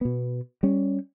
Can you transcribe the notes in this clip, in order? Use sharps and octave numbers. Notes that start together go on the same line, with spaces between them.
B2 B3
G3 C#4